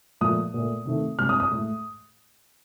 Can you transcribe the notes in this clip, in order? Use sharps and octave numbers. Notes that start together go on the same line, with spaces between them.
A#2 F3 A3 D#6
A#2 A3
C3 D#3 A3
C3 G3 F6
D#6
D#6
A2 A3